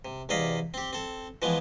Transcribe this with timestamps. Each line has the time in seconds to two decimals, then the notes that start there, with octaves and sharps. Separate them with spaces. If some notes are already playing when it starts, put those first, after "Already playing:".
0.05 C3
0.29 E2 C3 D5 D#5 F5 B5
0.74 C4 G4
0.93 C4 A4
1.42 E3 F3 G#3 B3